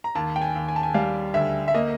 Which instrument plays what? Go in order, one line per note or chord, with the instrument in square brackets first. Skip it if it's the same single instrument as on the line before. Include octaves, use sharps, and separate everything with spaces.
[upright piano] A#5
[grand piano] D#2 [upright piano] A5
[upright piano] G5
G#5
[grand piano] D#2
[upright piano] G#5
A5
G#5
[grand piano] G3 [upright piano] F5
[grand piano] D2 [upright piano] E5
[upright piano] E5
[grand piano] A#3 [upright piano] D#5